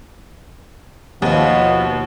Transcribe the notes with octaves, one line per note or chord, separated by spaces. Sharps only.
D#2 B2 F3 B3